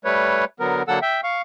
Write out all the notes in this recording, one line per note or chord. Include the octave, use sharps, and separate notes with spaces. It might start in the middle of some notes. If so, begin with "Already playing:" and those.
G3 A3 B4 C#5
D3 F#3 B3 A#4
D3 F#3 A#3 A4 F#5 E6
E5 G5
F5 C#6